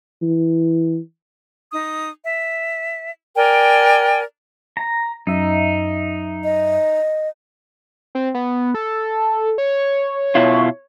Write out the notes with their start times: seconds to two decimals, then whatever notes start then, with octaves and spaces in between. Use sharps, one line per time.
0.22 E3
1.71 D#4 D#6
2.25 E5
3.36 A#4 D5 G5 G#5
4.77 A#5
5.27 F#2 D#4 E5
6.44 D#5
8.15 C4
8.34 B3
8.74 A4
9.58 C#5
10.35 B2 E4 F4